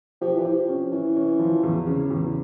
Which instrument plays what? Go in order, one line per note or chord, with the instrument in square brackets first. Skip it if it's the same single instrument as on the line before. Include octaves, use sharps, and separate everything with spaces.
[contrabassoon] F3 [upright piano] G4
[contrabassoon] E3
[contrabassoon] F3 [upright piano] G4
[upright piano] C#4
[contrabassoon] E3 [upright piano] C#4
[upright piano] C#4
F3
E2
C#3
E2